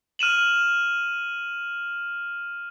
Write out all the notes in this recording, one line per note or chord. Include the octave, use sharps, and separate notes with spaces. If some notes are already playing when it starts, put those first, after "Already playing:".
F6 D#7 E7 F#7